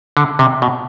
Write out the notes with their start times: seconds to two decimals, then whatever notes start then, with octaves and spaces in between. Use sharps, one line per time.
0.17 D3
0.39 C3
0.62 B2